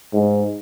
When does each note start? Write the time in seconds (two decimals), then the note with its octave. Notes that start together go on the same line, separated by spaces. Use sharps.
0.13 G#2